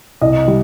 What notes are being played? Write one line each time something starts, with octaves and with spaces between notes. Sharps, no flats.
C2 D#5
G3